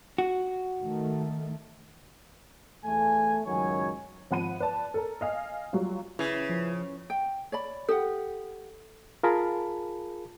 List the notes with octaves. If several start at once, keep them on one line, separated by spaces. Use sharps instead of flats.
F#4
D#3 A3
E2 A3 G#5
C#2 F#2 D#3 F#3 C#5 G#5
G#1 F3 F#5 B5 D#7
B4 D5 A5
A4 A#4
D#5 F5 G#5
F#3 G3 F4
C#3 E4 B4 G#6
F3
G5
C#5 D5 B5
G4 A4 F#5
F4 G#4 A#4 A5 B5